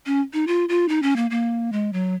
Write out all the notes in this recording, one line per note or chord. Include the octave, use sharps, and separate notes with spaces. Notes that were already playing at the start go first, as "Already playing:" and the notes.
C#4
D#4
F4
F4
D#4
C#4
A#3
A#3
G#3
F#3